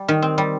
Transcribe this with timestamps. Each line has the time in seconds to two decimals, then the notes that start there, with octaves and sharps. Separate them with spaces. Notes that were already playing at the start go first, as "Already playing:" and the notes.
Already playing: G3
0.08 D#3
0.22 C4
0.38 G3